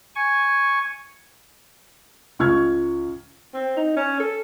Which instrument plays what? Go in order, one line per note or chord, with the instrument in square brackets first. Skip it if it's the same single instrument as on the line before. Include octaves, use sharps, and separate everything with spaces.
[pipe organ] G#5 C#6
[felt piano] C#2 C#6 F6 G#6
[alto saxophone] C4
D#4
C#4
A4